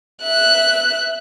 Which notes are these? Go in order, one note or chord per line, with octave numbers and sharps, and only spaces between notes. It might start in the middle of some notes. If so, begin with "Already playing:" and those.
E5 F#6